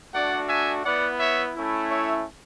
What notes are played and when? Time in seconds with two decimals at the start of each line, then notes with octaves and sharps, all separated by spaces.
0.14 A3 D4 F#4 D5 F#5
0.49 E5 G#5
0.84 B3 E4 D5 F#5
1.19 C#5 E5
1.55 A3 C#4 E4
1.89 C#5 E5